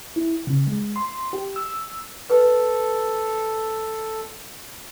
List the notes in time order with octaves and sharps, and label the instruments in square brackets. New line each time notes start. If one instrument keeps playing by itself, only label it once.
[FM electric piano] E4
C#3
G#3
C6
G4
E6
[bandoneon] A4 [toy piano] B4